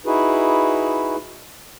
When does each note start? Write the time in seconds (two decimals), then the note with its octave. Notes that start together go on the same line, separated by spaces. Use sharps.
0.06 D#4 E4 F#4 G#4 B4